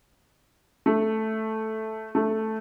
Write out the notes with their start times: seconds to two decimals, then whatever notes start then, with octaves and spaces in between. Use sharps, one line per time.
0.86 A3
2.15 A3